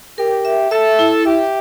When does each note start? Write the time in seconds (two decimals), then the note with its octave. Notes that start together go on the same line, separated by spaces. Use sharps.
0.18 G4 A#4
0.45 E5
0.71 A4 E5
0.99 E4
1.25 G4 E5